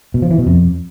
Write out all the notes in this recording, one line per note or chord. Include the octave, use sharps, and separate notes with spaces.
B2
F3
E3
B2
F2